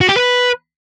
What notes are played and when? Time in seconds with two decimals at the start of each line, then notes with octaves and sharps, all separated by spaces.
0.01 F#4
0.09 G4
0.17 B4